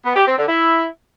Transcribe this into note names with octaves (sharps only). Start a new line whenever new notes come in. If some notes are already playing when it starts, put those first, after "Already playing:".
B3
G4
C4
D3
E4